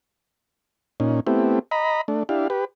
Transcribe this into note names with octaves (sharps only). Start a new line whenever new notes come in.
A#2 C#4 D#4
A3 B3 C4 E4 G4
D#5 A#5 B5
A3 D4
D4 E4 G4 F5
G4 B4